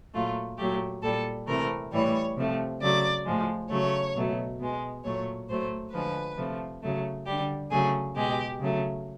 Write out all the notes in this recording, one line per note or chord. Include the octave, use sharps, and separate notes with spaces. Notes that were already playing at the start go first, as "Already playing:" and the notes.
A#2 F#3 A3 F4
A#2 F#3 A3 G4
A#2 G3 A4
C3 E3 A3 A#4
A2 E3 G3 C#5
C3 F3 A3
C#3 F#3 A3 D5
A2 F3 G#3
C#3 F#3 A3 C#5
B2 F#3 A3
B2 G#3
A#2 F#3 A3 C#5
A2 F#3 A3 C5
D3 F3 G#3 B4
C3 F3 A3
C#3 F#3 A3
D3 G3 G4
C#3 F#3 A3 G#4
B2 G#3 G4
C#3 F#3 A3